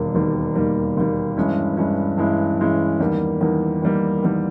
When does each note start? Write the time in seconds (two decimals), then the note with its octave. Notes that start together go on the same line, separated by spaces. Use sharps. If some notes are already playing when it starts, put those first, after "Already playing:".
Already playing: E1 D#2 D#3 G3 A#3
0.14 E1 D#2 D#3 G3 A#3
0.55 E1 D#2 D#3 G3 A#3
0.96 E1 D#2 D#3 G3 A#3
1.36 G2 E3 G#3 C#4 E4
1.77 G2 E3 G#3 C#4 E4
2.18 G2 E3 G#3 C#4 E4
2.59 G2 E3 G#3 C#4 E4
3.00 E2 D#3 G3 A#3
3.41 E2 D#3 G3 A#3
3.82 E2 D#3 G3 A#3
4.23 E2 D#3 G3 A#3